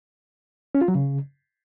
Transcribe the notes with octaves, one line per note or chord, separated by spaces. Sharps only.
C#4
F4
F#3
C#3